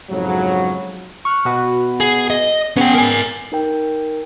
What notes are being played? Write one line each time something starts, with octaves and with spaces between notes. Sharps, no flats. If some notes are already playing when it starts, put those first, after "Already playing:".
F2 G#2 C#3 F#3
C#6 F6 F#6
B2 F#4 B4
G#4
D#5
B3 C#4 G#4 G5
A#4 G#5
D#4 A#4 G5